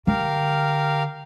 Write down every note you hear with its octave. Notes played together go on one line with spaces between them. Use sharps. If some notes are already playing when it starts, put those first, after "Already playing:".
D3 G4 A#4 F5